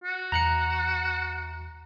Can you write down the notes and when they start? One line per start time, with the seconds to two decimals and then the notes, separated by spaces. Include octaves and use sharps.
0.04 F#4
0.32 E2 A#5 F#6 C#7